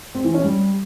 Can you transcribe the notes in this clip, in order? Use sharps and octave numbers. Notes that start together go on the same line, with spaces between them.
C4
E3
C#4
G3